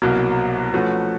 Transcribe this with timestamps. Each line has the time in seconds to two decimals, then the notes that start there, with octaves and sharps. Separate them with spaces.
0.02 C2 B2 F#3 A#3
0.74 F3 A3 C#4 F#4 B4